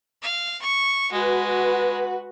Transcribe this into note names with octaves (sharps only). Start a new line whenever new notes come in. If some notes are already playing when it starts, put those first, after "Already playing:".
F5
C#6
G#3 F#4 B4